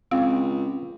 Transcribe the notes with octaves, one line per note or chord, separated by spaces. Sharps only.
C#2 C4 F5